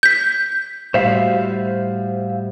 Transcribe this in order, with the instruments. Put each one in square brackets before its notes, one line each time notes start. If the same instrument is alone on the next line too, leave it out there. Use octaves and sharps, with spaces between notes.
[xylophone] G6 B6
[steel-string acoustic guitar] A2 G3 F#4 [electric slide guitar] C5 E5 F5